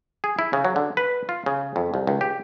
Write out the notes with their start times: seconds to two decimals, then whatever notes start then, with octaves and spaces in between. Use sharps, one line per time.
0.24 G#4
0.39 E4
0.53 C#3
0.65 F#3
0.76 D3
0.97 B4
1.29 F4
1.46 C#3
1.76 F2
1.94 C2
2.07 C#2
2.21 G4